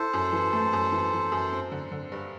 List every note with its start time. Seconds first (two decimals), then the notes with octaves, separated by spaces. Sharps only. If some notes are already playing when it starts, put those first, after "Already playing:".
Already playing: E4 A4 C5
0.13 F#2
0.32 E3
0.53 A3
0.73 F#2
0.92 E3
1.13 E3
1.32 F#2
1.52 C4
1.72 D3
1.92 D3
2.12 G2